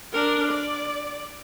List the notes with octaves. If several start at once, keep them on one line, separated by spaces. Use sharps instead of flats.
D4 A#4
D5